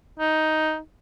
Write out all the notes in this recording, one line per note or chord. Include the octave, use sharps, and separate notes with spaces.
D#4